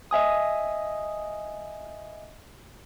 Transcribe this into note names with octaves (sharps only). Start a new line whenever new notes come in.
D#5 E5 G#5 D#6